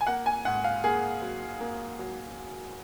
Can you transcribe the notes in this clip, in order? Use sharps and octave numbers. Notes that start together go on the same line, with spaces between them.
G#5
A#3 F#5
G#5
G#2 F#5
F5
A#3 G#4
F#3
A#3
F#3